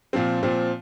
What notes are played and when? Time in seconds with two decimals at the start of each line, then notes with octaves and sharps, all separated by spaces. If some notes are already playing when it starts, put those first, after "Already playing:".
0.13 A#2 F3 C4
0.43 A#2 F3 C4